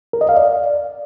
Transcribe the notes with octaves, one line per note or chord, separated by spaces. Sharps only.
A#4
D#5
F5
D5